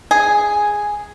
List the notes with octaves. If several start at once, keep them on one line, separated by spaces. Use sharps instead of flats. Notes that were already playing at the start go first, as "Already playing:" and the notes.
G#4